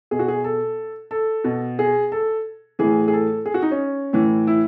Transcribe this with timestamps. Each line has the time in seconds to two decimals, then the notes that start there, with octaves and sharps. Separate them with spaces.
0.11 B2 G#4
0.19 F#4
0.28 G#4
0.44 A4
1.11 A4
1.44 B2
1.79 G#4
2.12 A4
2.79 A2 E3 G#4
3.08 G#4
3.13 A4
3.46 G#4
3.54 F#4
3.62 D#4
3.71 C#4
4.13 A2 E3
4.47 E4